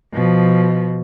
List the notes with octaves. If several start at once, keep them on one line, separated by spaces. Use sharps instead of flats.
B2 F3